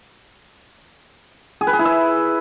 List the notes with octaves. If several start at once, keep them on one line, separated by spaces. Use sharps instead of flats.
G#4
B4
G#4
E4
E5